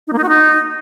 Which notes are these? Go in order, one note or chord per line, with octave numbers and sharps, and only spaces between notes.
D#4
A#3
D#4
F#4
D#4